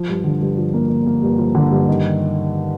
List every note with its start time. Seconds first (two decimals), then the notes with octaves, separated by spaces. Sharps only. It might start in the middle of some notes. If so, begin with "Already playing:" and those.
Already playing: F3
0.09 G2
0.24 D3
0.41 G2
0.58 F3
0.74 A#3
0.89 A#3
1.07 A#3
1.22 G2
1.38 F3
1.55 D3
1.71 G2
1.88 D#3